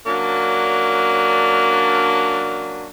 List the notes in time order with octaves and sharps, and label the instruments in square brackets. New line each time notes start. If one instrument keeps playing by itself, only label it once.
[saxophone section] F#3 A#3 C#4 D4